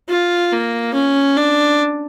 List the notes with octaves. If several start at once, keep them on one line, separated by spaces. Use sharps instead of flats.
F4
A#3
C#4
D4